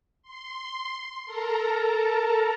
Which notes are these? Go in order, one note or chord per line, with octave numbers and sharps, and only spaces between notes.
C6
A4 A#4 A5 A#5